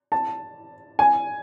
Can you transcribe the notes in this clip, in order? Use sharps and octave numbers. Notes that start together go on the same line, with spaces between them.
A5
G#5